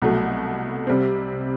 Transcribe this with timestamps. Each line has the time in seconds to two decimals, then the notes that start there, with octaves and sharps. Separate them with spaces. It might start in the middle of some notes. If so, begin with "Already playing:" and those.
0.02 C2 B2 F#3 A3
0.87 C3 G3 C4